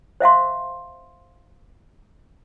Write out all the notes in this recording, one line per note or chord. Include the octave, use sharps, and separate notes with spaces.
C5 E5 F5 C6